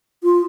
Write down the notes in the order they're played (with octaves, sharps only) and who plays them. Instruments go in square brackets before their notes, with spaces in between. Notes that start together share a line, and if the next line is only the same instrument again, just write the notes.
[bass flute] F4